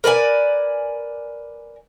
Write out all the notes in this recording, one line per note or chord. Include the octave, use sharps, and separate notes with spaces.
A#4 B4 D5 G#5